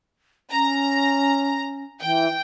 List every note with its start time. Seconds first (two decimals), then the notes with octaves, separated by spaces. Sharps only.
0.51 C#4 A#5
2.02 E3 G5